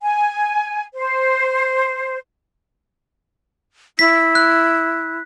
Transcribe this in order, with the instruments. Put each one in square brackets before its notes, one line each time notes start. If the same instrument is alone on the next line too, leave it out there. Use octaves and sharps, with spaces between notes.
[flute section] G#5
C5
[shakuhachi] E4 [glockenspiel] B6
[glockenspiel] F#6